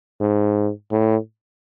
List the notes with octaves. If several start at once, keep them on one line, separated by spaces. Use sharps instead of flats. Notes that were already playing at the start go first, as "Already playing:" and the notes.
G#2
A2